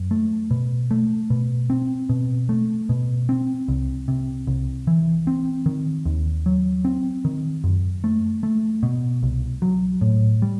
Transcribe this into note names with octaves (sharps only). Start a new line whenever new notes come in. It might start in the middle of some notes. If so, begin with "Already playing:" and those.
Already playing: F#2
A3
B2
A3
B2
C4
B2
A3
B2
C4
C2
C3
C2
E3
C4
D#3
D#2
F#3
C4
D#3
F#2
A3
A3
B2
C2
F#3
A2
G3